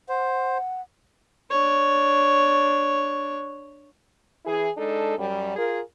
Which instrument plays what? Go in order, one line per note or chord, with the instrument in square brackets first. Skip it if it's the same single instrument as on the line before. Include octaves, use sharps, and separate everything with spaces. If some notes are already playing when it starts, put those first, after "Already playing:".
[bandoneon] C5 [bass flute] F#5
[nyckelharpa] D4 C#5
[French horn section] E3 E4 G#4
G#3 D4 D#4 A4
F#2 G3
F4 G#4 A#4